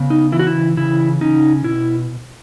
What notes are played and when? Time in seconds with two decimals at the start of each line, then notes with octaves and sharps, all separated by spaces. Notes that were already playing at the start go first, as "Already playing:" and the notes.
Already playing: C#3 B3
0.10 D#4
0.32 E3 E4
0.39 F#4
0.47 E4
0.77 C#3 E4
1.21 C#4 D#4
1.64 B2 E4